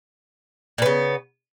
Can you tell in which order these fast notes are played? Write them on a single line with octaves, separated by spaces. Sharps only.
A#2 B3 C#3